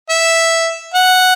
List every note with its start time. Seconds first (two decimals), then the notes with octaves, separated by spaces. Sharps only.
0.10 E5
0.94 F#5